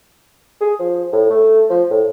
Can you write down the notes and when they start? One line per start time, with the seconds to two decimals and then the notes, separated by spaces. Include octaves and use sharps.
0.61 G#4
0.79 F3
1.12 A2
1.30 A3
1.70 F3
1.90 A2